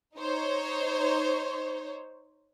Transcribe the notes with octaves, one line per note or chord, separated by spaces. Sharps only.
D#4 C5 C#5